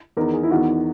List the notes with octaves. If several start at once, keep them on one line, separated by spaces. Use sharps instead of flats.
E2 D#3 A#4
G#4
E4
E2 D#3 F#4